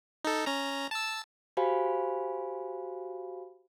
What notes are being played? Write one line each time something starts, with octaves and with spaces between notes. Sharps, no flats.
D#4 A4
C#4 A#5
A5 E6
F#4 G4 C5 F5 G#5 B5